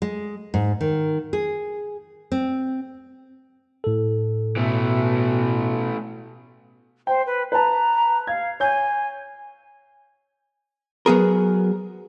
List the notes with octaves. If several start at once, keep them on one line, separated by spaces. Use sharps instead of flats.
G#3
G#2
D#3
G#4
C4
A2 A4
B2 E3 A3
C5 G5
B4
B4 A5 A#5
F5 G#6
C#5 G#5 G6
F#3 B3 G#4 A#4